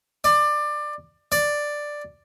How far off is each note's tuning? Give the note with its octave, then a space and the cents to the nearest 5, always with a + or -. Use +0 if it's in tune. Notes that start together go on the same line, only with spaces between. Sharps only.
D5 +20
D5 +5